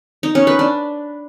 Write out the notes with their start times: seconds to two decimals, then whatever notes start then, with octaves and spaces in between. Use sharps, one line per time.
0.23 D#4
0.35 C#4
0.47 B4
0.59 D4